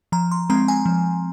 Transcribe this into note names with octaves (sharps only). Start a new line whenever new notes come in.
F3 A#5
C6
G#3 C4 A#5
G#5
F3